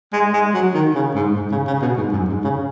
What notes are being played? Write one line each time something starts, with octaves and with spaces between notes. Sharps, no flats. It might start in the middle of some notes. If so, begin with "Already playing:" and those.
G#3
G#3
F#3
D#3
C#3
G#2
G#2
C#3
C#3
B2
G#2
F#2
G#2
C#3